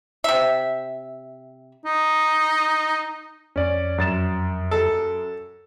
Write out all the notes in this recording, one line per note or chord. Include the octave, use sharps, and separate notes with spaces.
C3 E5
D#4
F2 C#4 D5
F#2 A6 E7
A4